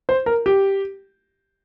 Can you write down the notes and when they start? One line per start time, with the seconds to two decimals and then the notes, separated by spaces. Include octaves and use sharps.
0.09 C5
0.26 A#4
0.46 G4